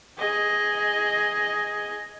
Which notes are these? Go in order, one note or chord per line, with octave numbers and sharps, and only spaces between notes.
G#4 D#5